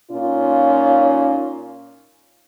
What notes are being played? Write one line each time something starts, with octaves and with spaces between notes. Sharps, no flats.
A#2 C#4 D#4 F4